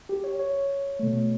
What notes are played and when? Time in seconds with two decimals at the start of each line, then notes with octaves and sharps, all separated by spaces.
0.09 G4
0.24 C#5
0.39 C#5
0.99 B2 A3